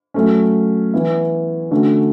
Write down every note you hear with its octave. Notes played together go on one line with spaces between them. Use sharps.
F#3 A3 C#4
E3 B3 E4
D3 A3 C#4 F#4